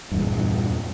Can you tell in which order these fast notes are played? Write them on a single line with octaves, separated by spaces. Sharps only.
G2 E2 A#2